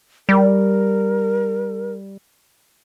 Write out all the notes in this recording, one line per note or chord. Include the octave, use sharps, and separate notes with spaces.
G3 A#4